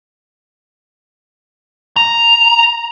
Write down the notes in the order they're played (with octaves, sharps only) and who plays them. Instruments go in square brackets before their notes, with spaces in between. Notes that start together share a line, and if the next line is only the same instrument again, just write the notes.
[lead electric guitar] A#5